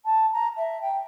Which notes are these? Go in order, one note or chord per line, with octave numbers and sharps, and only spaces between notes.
A5
A#5
E5
G5